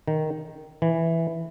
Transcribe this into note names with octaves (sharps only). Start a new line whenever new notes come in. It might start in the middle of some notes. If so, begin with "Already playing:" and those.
D#3
E3